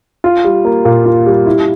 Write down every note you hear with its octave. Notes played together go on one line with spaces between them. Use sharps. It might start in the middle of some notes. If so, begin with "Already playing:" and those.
F4
G3
A#3
A#2
F4
G3
E4